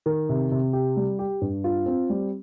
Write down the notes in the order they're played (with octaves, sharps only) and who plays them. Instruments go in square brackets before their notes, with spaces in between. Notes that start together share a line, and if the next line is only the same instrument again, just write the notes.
[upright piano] D#3
C3
C3
G4
G3
G4
G2
F4
C4
G3